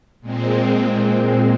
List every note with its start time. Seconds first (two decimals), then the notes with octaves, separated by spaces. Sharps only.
0.21 A#2 G#3 C4